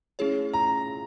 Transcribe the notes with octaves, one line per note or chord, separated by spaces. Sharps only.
A3 C#4 E4 G#4 C#5
A#5